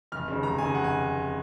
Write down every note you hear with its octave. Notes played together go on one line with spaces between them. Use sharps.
F1 F6
D#2 C#3
F1 A#5
D#2 C#3 G#5
F1 F#5
G#5